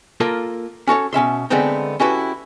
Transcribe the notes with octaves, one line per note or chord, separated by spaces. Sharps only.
A#3 F4 A4 A#4
C#4 F#4 A4 C#5
B2 C#4 E5 C6
D3 G#3 A3 B3 C4 D#4
C#4 E4 F#4 G4 A4 B4